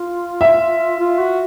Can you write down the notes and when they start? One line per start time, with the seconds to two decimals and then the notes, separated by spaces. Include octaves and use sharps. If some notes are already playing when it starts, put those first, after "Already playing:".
Already playing: F4
0.41 E5
1.00 F4
1.19 F#4